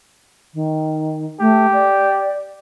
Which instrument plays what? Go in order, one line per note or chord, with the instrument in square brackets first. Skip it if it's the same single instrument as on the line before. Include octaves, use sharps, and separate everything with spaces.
[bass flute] D#3
[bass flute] A3 [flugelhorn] G4
[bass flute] D5